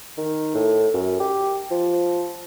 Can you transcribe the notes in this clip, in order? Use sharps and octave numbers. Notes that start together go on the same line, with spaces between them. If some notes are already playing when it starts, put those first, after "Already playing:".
D#3
A2
F#2
G4
F3